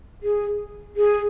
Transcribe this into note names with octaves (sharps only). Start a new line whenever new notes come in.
G#4
G#4